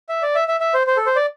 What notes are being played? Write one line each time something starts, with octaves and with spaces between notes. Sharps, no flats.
E5
D5
E5
E5
E5
C5
C5
A4
C5
D5